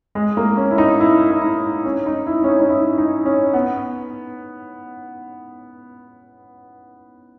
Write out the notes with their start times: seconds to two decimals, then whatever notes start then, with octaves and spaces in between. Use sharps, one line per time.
0.15 G#3
0.37 A#3
0.57 C#4
0.71 E4
0.78 D#4
1.00 E4
1.31 E4
1.42 D#4
1.85 C#4
2.06 D#4
2.27 E4
2.44 C#4
2.49 D#4
2.60 D#4
2.69 E4
2.98 D#4
3.26 C#4
3.54 B3